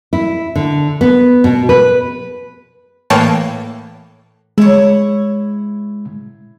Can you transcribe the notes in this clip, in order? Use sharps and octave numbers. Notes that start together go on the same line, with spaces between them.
E4
D3
B3
B2
B4
A2 E3 A#3 C#5 G5 A5
G#3 E4 C#5